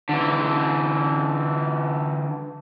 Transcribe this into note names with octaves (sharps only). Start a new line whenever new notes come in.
D3 E3